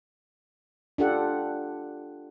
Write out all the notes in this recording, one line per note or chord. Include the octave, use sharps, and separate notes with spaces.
D4 F4 G4 A4 F#5